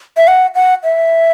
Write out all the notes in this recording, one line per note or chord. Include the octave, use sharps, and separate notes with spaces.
E5
F#5
F#5
E5